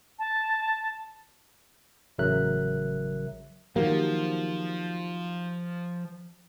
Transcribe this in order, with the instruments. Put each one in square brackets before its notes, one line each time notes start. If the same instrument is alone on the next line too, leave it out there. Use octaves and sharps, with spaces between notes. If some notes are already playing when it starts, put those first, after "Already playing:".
[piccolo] A5
[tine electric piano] A1 C#3 F#3 A#4 E5 F#6
[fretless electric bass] D#3 F#3 A#3 [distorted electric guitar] F3 [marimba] G4